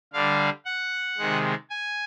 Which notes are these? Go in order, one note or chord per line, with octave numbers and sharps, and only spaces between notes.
D3 G3 F5
F#5
C3 D#3 G#3
G#5